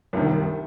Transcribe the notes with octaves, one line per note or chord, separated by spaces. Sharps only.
C2 C3 D#3